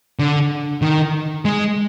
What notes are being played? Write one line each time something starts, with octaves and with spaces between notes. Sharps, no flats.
D3
D#3
G#3